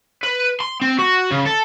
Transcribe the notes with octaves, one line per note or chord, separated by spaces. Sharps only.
B4
C6
C4
F#4
C#3
A4